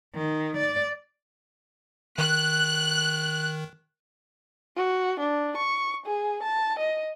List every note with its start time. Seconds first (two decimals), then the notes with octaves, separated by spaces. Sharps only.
0.15 D#3
0.57 D5
2.18 D#3 F#6
4.77 F#4
5.19 D4
5.57 C#6
6.06 G#4
6.43 A5
6.79 D#5